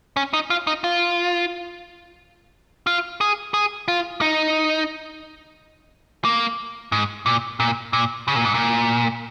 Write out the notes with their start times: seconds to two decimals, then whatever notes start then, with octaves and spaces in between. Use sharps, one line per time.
0.17 C#4
0.33 D#4
0.50 F4
0.67 D#4
0.84 F4
2.87 F4
3.21 G#4
3.54 G#4
3.88 F4
4.21 D#4
6.25 A#3
6.92 G#2
7.26 A#2
7.60 A#2
7.93 A#2
8.28 C#3
8.36 A#2
8.45 G#2
8.54 A#2